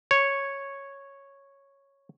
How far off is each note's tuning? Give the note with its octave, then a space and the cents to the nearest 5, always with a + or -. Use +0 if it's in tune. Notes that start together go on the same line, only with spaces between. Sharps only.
C#5 -5